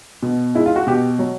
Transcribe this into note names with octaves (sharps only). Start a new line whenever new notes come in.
B2
G#3 E4
F4
F#4
B2 G4
F#3